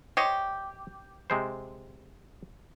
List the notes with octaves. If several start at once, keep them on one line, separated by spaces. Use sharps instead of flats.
G4 C5 C#5 D#5
C3 G#3 C5